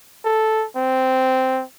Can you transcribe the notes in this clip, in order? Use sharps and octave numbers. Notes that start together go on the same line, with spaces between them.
A4
C4